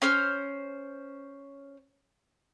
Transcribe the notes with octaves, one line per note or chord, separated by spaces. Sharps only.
C#4 C5 F6